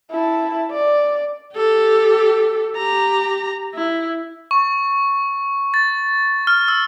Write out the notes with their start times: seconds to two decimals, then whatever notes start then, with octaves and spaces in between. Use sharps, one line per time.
0.11 E4 A5
0.71 D5
1.55 G4 A4
2.76 G4 A#5
3.74 E4
4.51 C#6
5.74 A6
6.47 F6
6.68 E6